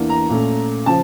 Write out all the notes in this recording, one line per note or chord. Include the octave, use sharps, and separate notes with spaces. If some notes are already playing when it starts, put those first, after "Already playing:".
Already playing: E2 E3 A#3 D4
A#5
A#2 A3 C#4
C#3 F3 A5